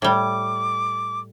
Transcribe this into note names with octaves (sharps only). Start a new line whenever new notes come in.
A2 G3 D6